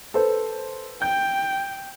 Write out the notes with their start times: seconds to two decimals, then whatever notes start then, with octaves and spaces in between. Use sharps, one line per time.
0.14 A4 B4 C5
1.02 G5 G6